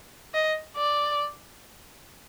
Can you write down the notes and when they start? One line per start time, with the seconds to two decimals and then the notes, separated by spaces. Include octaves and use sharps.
0.34 D#5
0.77 D5